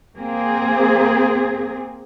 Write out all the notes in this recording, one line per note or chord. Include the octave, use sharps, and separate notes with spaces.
A#3 C4 G#4